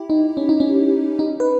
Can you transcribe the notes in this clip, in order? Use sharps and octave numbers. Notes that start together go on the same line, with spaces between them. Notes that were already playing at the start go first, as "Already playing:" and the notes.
Already playing: E4 G4
D#4
C#4
D#4
C#4
D#4
B4